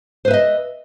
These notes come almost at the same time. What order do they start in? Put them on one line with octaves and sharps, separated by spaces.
C5 B4 E5 D#5